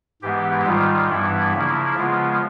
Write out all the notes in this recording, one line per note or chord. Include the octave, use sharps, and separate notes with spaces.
G#2 E3 G#3 B3 G4
G#2 D#3 G3 F4
G2 E3 G3 B3 E4
C#3 F3 A#3
C#3 F3 G#3 B3 F4